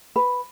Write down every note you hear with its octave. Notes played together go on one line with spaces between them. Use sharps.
B4